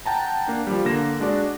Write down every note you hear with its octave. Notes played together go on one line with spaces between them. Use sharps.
F#5 G5 A5 A#5
A#3 D4
F3 G3
D3 A#3 A#6 E7
G#3 D4 F#4 D5